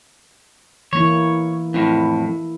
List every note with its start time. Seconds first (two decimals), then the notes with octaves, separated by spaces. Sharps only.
0.93 E3 A#3 E4 C#5
1.74 F2 A2 E4